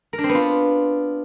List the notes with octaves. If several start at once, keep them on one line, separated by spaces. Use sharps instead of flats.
A#4
D4
C4
B3
F4